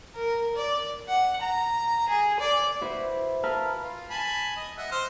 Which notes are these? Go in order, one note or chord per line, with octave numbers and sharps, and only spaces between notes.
A#4
D5
F#5
A#5
G#4
D5
E4 F#4 B4 C5
A#4 B4 F5 A5 E6 F6
F4
G#5 A5 B5
D#5
D#5 E5 F#5
C5 F6